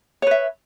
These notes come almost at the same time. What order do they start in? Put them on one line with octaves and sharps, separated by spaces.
C#5 B4 E5